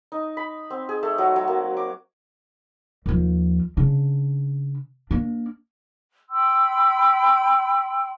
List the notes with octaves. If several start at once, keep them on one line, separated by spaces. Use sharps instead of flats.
D#4
B5
C4
G#4
A3
F#3
F#3
A#3
D6
D#2 F3
C#3 D4
A#3 D4
G5 B5 C6 E6